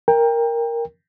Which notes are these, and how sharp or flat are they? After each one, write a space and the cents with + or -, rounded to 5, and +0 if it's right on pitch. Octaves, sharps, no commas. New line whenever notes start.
A#4 +0 G5 +25